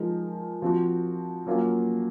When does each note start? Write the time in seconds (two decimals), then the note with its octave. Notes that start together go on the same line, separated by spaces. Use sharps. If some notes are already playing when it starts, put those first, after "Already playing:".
Already playing: F3 G#3 D#4 A#4
0.62 F3 C4 F#4
1.47 F#3 A#3 C#4 F4